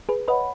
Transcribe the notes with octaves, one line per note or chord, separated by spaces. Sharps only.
G#4 B4
B4 C#5 D#5 F#5 B5